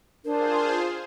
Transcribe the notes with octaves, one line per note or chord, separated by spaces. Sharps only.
D4 F4 G#4 A#4 C5